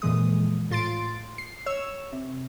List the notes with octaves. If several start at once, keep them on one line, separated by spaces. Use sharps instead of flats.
F2 A#2 E3 G#3 D#6
A2 F4 C6 A6 D7
C7
C#5 E6
C3